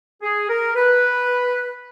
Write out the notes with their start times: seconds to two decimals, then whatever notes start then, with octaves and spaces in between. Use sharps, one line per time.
0.23 G#4
0.50 A#4
0.75 B4